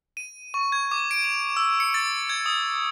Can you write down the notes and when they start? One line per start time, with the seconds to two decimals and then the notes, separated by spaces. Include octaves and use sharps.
0.17 D#7
0.54 C#6
0.72 G#6
0.91 D6
1.11 D7
1.24 F7
1.57 E6
1.80 C#7
1.94 A6
2.30 G#6
2.46 D#6